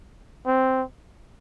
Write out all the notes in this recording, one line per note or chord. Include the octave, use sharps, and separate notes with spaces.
C4